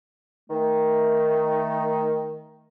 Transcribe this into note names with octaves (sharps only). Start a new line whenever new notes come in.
D#3 A3